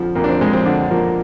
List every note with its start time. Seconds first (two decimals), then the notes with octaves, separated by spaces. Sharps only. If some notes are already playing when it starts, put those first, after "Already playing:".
Already playing: F2 D3 F3
0.15 F2 A#3
0.24 D4
0.29 C4
0.41 F2 G#3
0.53 C4
0.65 D3 D4
0.91 F3 A#3